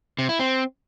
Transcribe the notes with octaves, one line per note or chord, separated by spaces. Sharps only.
C3
E4
C4